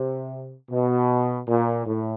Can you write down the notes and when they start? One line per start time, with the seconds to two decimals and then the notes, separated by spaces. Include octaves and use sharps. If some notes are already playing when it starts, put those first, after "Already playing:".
Already playing: C3
0.70 B2
1.48 A#2
1.86 A2